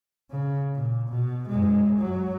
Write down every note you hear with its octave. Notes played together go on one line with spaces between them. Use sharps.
C#3
A#2
B2
F#2 G#3
F#3